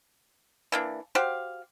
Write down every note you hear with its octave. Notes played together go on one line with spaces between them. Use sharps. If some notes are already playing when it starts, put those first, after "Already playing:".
E3 A#3 D4
F#4 G4 C5 F5